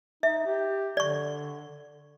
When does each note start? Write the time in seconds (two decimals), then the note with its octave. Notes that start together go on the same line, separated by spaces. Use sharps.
0.23 D#4 E5
0.46 G4
0.97 D3 D5 C#6